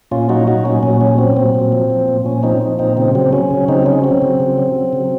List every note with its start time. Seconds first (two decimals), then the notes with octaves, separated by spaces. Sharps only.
0.11 A#2 C#4 F4
0.29 F#3 D#4 F#4
0.47 F#3 D#4 F#4
0.65 A#2 C#4
0.83 A#2 C#4
1.01 F#3 C#4
1.18 F#3 C4
1.37 A#2 C4
1.55 A#2
1.72 F3
1.90 F3
2.08 A#2
2.26 A#2 C#4
2.43 F3 C4 D#4
2.61 F3
2.79 A#2 C4 D#4
2.97 C#3 C4
3.15 F#3 C4
3.33 F#3 C#4
3.51 C#3
3.68 C#3 C4 D#4
3.86 F#3 C#4
4.04 F#3 C4
4.22 C#3
4.40 C#3
4.58 F#3
4.75 F#3
4.93 C#3